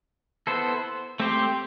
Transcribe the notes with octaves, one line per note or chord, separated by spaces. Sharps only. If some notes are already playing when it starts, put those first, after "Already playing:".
B3 E4 A4 C5
A3 C4 G4 C5